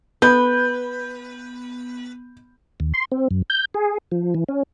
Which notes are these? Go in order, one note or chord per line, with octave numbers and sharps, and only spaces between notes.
B3 B4 G6
D#2
C6
C4
F#2
G6
G#4
F3
E3
C#4